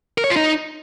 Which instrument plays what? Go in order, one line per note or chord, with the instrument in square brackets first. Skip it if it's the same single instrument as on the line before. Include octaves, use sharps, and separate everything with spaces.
[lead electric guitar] A#4
C#5
F4
D#4